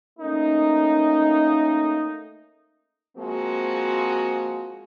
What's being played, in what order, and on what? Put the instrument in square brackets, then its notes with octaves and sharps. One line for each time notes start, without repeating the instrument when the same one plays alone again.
[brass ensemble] A3 A#3 C#4 D#4
[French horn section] F3 G#3 A#3 C4 F#4